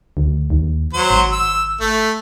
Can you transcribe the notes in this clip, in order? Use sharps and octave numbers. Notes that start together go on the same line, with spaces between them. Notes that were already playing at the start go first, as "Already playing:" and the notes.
D2
D#2
F#3 C5
G#1
E6
A3